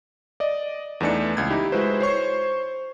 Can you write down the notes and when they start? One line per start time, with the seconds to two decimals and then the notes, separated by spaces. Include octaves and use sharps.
0.40 D5 D#5
1.00 E2 E3 A3 D4 D#4 C#7
1.37 C#2 G#6
1.50 D#4 E4 G4
1.72 G#3 E4 F#4 B4 C5
2.01 C5 C#5 C#6 C7